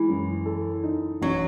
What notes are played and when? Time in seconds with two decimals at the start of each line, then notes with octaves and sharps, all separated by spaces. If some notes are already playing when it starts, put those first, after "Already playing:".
Already playing: E3 G#3
0.08 F#2
0.46 A4
0.83 D#4
1.22 A1 F#3